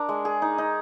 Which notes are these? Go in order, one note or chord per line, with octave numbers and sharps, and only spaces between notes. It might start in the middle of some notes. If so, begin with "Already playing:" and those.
Already playing: D4 A#4
G#3
G#4
D#4
D#4